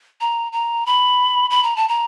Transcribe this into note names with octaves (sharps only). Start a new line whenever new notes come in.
A#5
A#5
B5
B5
A#5
A5
A#5